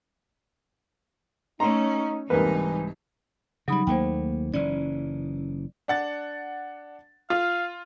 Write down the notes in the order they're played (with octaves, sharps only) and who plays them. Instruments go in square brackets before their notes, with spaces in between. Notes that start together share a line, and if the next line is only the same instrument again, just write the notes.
[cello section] A3 C#4 [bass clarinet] D#4 [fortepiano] A#5 C6
[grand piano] C2 G#2 [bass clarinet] E3 [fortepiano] A#3 B4 [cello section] D#4
[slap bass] C#3 G3 [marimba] F#3 D#4 B5
[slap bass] D#2 A3 A#3 [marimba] C5 G5
[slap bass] F#1 E3 C#4 [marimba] D5
[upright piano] D4 F#5 A6
[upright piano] F4 [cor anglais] F5